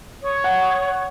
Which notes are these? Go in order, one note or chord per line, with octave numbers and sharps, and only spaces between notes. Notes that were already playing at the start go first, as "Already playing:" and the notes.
C#5 C#6 D#6
F#5